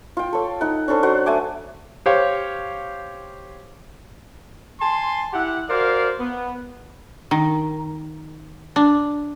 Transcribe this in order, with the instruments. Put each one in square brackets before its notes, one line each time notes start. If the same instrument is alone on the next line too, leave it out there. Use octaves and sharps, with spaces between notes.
[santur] F4 G5
A4 C#5
D#4 F#5
C#4 D4 A4 C5
F#3 C5 F#5
A3 G#5 D6
[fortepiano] G4 C5 C#5 F5
[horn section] G#5 A5 C6
E4 G4 F#5
F#4 A#4 C5 D5 F5
B3
[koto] D#3
D4